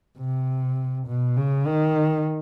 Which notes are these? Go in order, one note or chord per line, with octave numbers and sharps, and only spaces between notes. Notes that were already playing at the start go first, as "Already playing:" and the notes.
C3
B2
C#3
D#3